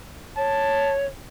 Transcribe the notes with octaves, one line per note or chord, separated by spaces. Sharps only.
C#5 A5